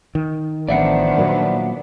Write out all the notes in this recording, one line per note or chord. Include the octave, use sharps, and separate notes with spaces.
D#3
A1 D#3 F3 B3 D4 D5 E5 F#5
A#2 F#3 A#3